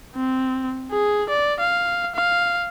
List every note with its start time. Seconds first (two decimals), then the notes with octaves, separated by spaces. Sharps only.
0.15 C4
0.91 G#4
1.29 D5
1.60 F5
2.15 F5